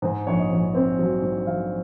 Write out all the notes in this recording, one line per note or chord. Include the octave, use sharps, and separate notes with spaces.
G#2 C5
A#1 C#5
D#5
A#1
C4
F#3
G#2
F#3 F5